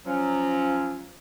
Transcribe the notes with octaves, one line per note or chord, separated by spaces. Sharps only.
F3 F#3 C#4